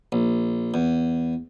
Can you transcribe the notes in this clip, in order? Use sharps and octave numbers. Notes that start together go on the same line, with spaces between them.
A#1
E2